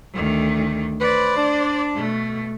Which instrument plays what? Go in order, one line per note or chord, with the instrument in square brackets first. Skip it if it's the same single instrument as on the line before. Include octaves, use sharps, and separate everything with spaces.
[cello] D2 D#3
[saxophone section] B4 [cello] C5 D5
[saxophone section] D4
[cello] B2 A3